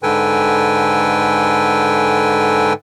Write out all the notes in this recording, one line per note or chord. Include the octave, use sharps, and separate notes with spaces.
G#2 D3 A4 B4 G5 G#5